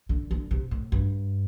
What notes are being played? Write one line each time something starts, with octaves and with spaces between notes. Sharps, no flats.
D3
D3
C3
A2
G2